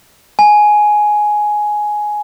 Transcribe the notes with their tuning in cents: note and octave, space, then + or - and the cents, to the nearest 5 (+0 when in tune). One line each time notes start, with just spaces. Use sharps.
G#5 +10